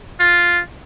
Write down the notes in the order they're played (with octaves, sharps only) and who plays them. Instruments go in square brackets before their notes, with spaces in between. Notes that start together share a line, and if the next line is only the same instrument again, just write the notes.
[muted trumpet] F4